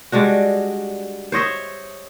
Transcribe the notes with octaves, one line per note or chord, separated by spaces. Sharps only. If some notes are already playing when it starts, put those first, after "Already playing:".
G3 G#3 D4 F#4
C5 C#5 D#5 E5